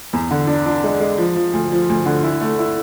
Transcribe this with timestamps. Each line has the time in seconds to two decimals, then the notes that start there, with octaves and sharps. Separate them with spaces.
0.13 E2
0.31 D3
0.47 D4
0.66 D4
0.84 G#3
1.00 G#3
1.18 F3
1.36 F3
1.53 D2
1.72 F3
1.89 D2
2.06 D3
2.23 E4
2.41 A3
2.59 E4